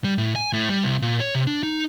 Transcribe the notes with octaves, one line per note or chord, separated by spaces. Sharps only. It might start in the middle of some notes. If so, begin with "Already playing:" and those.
G3
A2
G#5
A2
G3
C2
A#2
C#5
C3
D4
D#4